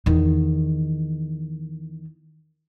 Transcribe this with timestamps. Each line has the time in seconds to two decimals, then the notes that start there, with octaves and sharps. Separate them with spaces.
0.06 E2 D#3